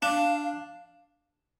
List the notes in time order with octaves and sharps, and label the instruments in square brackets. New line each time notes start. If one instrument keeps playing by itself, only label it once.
[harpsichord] D4 [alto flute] F5